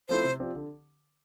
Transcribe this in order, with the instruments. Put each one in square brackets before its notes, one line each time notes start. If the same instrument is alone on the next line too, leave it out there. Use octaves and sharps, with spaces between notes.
[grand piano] F3 A3 C4 E4 [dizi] C5
[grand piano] C3
F3 C4 G4 D5
D3